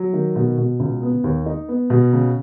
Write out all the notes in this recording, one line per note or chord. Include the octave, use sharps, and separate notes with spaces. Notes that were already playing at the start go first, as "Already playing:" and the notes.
Already playing: F#3
D#3
B2
B2
C#2
B3
D#2
D#4
B3
B2
C#3